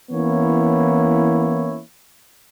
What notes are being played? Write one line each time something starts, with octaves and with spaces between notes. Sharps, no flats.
E3 A#3 B3 C#4 E4 C#5